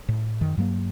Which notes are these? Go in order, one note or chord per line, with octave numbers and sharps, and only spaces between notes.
A2
F#2 D#3
G2 F#3 A#3